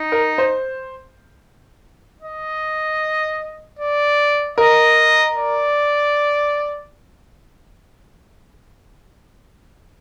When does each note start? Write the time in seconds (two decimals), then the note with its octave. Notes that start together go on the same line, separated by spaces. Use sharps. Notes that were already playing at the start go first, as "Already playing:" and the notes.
Already playing: D#4
0.12 A#4
0.38 C5
2.22 D#5
3.79 D5
4.58 A#4 D#5
5.37 D5